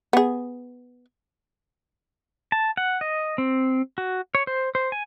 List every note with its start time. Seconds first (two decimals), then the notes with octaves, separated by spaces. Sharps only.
0.13 B3 G#4
2.52 A5
2.77 F#5
3.01 D#5
3.38 C4
3.98 F#4
4.35 C#5
4.47 C5
4.75 C5
4.92 G#5